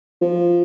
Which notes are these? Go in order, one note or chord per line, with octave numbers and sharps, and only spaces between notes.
F3